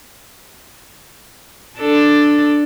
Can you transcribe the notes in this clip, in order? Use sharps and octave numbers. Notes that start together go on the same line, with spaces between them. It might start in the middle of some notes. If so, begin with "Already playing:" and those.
D4 A4